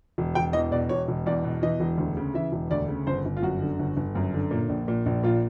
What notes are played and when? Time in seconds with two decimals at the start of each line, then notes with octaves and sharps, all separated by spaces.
0.18 E1
0.35 E1 G5
0.53 E2 D#5
0.72 B2 D5
0.89 E1 C#5
1.08 E1
1.26 E2 D5
1.44 B2
1.62 E3 D#5
1.80 E1
1.98 D2
2.17 C#3
2.34 E3 E5
2.52 E1
2.71 D2 D5
2.88 C#3
3.07 G1 C5
3.25 G1
3.37 F4
3.42 F#2 F#4
3.62 D3
3.79 G1
3.97 G1
4.15 F#2
4.34 D3
4.51 A#2
4.69 A#1
4.88 A#2
5.06 A#1
5.23 A#2 F4